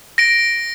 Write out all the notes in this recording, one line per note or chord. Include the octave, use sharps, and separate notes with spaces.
A#6 D7